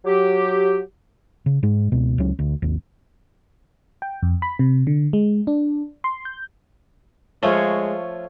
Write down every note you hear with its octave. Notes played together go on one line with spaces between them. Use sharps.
F#3 G4
C#3
G#2 G#3
C#2 B2
C#2 F#3 C#4
D2
G#1 D#2
G5
F2
B5
C3
D3
G#3
D4
C6
G6
F3 G#3 A3 C#5 F5